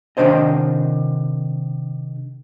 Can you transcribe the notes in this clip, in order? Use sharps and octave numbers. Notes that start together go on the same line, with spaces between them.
C3 D#3 F#3 D4 C5 D#5